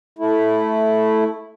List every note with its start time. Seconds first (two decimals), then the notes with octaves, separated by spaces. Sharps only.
0.19 A3 E4